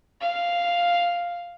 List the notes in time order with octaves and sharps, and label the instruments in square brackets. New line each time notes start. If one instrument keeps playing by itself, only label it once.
[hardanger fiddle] F5